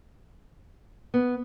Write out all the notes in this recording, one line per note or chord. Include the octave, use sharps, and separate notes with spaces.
B3